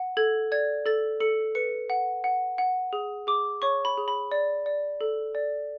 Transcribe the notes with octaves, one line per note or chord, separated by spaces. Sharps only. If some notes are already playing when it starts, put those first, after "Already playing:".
Already playing: F#5
A4 G#6
D5 G#6
A4 A6
A4 C#7
B4 C#7
F#5
F#5
F#5
G#4
G#4 D6
C#5 C#6
B5
G#4
B5
D5
D5
A4
D5